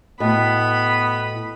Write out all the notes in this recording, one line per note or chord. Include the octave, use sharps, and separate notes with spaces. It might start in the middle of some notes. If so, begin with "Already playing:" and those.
A2 B3 F#4 D#5 B5